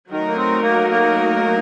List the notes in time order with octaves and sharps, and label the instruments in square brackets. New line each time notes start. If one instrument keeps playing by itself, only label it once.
[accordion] D#3 [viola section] F#3 A3 D#4 F#4 A#4
[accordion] A#3
C4
A#3
A#3